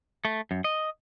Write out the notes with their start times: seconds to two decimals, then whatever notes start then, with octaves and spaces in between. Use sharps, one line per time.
0.25 A3
0.51 F#2
0.64 D#5